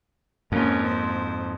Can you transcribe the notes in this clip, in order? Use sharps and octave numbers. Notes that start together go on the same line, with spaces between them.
F2 G#2 A#3 C#4
C5